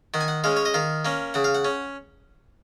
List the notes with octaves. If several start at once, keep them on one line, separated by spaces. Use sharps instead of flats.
D#3 F#5
G#5
F#5
G#3 C#4 F5
C#5
D#5
D#3 F5
A#3 C#4
C#3 F#5
F5
F#5
C#4